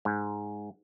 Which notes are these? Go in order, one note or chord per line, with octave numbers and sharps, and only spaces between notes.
G#2